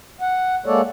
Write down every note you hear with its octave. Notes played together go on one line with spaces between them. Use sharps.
F#5
G#3 A#3 A4 C#5 D5